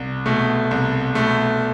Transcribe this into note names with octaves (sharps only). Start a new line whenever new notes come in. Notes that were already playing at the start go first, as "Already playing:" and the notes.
Already playing: C2
B2 A3
C2
B2 A3